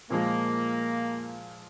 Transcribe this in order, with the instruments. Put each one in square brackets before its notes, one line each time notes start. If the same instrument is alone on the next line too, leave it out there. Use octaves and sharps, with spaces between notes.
[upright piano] A#2 F3 G#3 [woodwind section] A#3